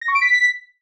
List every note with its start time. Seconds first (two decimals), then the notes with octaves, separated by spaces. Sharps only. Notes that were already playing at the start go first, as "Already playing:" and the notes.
0.01 A#6
0.08 C#6
0.15 D7
0.22 B6